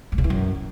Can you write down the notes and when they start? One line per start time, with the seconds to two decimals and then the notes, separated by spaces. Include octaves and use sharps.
0.12 G2
0.18 C#3
0.24 E3
0.30 F#2